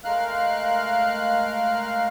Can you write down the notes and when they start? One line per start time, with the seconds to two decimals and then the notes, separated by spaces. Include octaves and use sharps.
0.04 G#3 A3 A#4 F5 F6 F#6